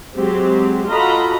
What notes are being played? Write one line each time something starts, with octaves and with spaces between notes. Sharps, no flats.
F#3 G#3 C4 G4
F4 F#4 A4 D#5 A#5 B5